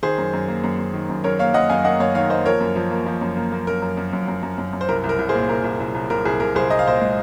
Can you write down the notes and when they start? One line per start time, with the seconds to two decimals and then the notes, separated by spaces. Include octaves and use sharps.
0.03 D#3 G#4 C5
0.18 F#2
0.33 F#2
0.48 A#3
0.64 F#2
0.79 F#2
0.93 D#3
1.09 F#2
1.24 F#2 A#4 C#5
1.39 A#3 C#5 F5
1.54 F#2 D#5 F#5
1.69 F#2 F5 G#5
1.85 A#3 D#5 F#5
2.00 F#2 C#5 F5
2.15 D#3 C#5 F5
2.30 A#3 C5 D#5
2.46 F3 A#4 C#5
2.61 F#2
2.76 F3
2.91 A#3
3.06 F3
3.21 F#2
3.37 A#3
3.52 A#3
3.67 F#2 A#4
3.82 F#2
3.97 F#2
4.13 F#2
4.28 F#2
4.43 F#2
4.58 F#2
4.73 F#2
4.81 C5
4.88 C2 A#4
5.04 C2
5.09 A#4
5.19 C2
5.29 G#4 C5
5.34 A#2
5.49 C2 A#4
5.64 C2
5.80 C2
5.94 C2
6.10 C2 A#4
6.25 C2 G#4
6.40 C2 A#4
6.55 C2 G#4 C5
6.70 C2 D#5
6.79 F5
6.86 A#2 C5 D#5
7.01 G#3